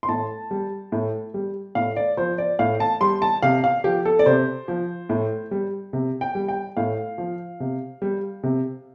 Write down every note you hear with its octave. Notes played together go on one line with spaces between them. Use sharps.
C6
A2 A5
G3
A2
G3
A2 F5
D5
F3 C5
D5
A2 F5
A5
G3 C6
A5
C3 F5
F5
F3 G4
A4
D5
C3 C5
F3
A2
G3
C3
G5
G3
G5
A2 F5
F3
C3
G3
C3